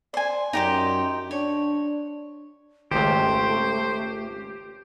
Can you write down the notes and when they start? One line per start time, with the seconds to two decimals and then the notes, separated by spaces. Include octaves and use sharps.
0.14 C5 D5 G#5
0.53 F#2 D#4 G4 C5
1.31 D4 C#5
2.91 G#1 C#2 A3 G4 C5